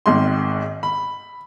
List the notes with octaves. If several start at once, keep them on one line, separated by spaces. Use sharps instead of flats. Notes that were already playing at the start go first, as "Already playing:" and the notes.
G#1 G#2 D#3 C6
B5